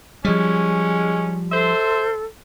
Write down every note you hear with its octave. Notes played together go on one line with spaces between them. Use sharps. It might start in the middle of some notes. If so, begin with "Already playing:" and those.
F3 G3 G#3 C#4
A4 C5 E5 C6